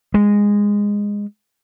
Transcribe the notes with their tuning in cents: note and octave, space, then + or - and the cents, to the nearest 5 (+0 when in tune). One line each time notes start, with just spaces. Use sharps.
G#3 -15